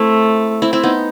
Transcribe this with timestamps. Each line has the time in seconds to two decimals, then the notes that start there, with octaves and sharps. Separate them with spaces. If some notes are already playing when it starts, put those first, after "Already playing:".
Already playing: A3 C4 E4
0.62 C4 E4
0.73 C4 E4
0.83 B3 D#4